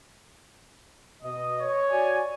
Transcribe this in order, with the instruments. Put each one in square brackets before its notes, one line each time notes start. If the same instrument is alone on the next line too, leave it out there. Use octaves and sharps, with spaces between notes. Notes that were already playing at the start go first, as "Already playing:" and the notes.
[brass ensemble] B2 D#5
[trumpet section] C#5
[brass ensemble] F#4 D5 G#5